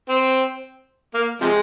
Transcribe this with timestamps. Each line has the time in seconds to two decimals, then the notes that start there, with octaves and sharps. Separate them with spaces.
0.10 C4
1.14 A#3
1.41 C3 F3 G#3